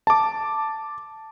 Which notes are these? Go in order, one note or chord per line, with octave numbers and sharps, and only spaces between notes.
A5 D6